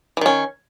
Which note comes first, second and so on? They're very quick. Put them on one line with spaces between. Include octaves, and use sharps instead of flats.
E3 D#3 C#4